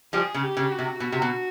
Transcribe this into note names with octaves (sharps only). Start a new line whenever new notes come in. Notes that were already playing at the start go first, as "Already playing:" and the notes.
F3 G3 G#4
C#3
G4
C#3
F#4
C3
B2 F#4
C3
B2